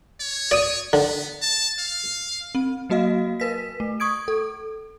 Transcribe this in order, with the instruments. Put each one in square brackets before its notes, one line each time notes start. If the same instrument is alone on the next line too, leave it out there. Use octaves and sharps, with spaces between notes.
[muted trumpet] C#5
[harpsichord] D5 D#6
[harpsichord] D3 [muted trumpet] B3
[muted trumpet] A5
F5
[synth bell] C4
F#3 A#3 F#4 D#5 F5
A#4 B4 B6
A3
C#6 D#6 G#6 D7
A4